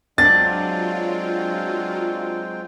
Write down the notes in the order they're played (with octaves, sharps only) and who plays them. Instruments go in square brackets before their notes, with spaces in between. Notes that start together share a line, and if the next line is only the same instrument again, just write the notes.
[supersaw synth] F#3 F4 [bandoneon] G#3 C4 G5 [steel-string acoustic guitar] D4 [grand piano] A6